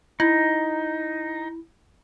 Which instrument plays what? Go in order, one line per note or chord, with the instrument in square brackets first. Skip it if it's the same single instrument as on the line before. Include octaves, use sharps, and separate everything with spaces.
[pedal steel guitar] D#4 [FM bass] E4